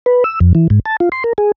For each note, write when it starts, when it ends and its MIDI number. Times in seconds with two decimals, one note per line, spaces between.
0.06 0.24 71
0.24 0.39 88
0.40 0.53 41
0.55 0.68 52
0.70 0.80 44
0.86 0.97 81
1.00 1.09 65
1.12 1.24 84
1.24 1.33 70
1.38 1.52 68